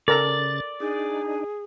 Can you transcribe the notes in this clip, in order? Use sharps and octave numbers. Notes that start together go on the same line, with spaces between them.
C#3 A4 A#4 D5 A#5 A6
D4 D#4 G#4